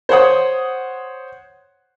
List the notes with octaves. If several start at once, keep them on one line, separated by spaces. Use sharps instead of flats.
C5 C#5 F#5 D#6